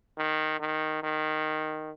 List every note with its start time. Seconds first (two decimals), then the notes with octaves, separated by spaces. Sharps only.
0.18 D#3
0.60 D#3
1.03 D#3